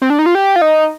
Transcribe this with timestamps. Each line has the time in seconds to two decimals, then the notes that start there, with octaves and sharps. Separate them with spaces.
0.02 C4
0.10 D4
0.19 D#4
0.26 F4
0.35 G4
0.56 F4
0.62 D#4